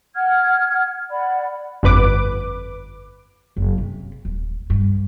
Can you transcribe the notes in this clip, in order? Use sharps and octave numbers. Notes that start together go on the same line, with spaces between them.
F#5 F6 G#6
D5 F#5 B5
G1 F2 B4 D6
F#1
C3
D#1
G2